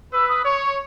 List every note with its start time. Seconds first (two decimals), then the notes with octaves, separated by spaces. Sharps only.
0.13 B4 E6
0.29 D#6
0.45 C#5 C#6
0.61 C#6